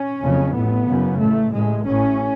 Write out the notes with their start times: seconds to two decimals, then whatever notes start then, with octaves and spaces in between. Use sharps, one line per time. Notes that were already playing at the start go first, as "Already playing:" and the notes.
Already playing: C#4
0.22 F#1 F2 C#3
0.54 A1 A2 B3
0.88 F#1 F#2 C#3
1.20 A1 A2 A3
1.53 A1 A2 G#3
1.86 A1 A2 C#4